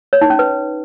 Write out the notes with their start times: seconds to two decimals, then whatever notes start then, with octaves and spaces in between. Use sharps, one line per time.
0.13 C#5
0.21 D#4
0.30 C#4
0.39 B4